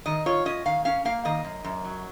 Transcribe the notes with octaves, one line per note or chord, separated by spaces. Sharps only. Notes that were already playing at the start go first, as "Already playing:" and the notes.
D#3 D#5
F4 C#5
C#4 D#5
D#3 F5
C#4 F5
A#3 F5
D#3 D#5
F#2
F#2
F#3